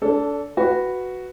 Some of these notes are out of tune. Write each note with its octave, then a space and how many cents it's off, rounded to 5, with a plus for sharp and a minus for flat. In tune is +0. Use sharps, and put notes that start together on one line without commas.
D4 -30 A4 +0
F#4 +0 B4 +0